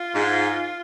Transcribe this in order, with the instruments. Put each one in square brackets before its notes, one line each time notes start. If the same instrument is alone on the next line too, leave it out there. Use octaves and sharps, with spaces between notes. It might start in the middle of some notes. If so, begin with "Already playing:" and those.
Already playing: [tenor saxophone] F4
[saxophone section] G#2